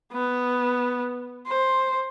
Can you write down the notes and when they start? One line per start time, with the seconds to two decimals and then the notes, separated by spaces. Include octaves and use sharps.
0.13 B3
1.47 C5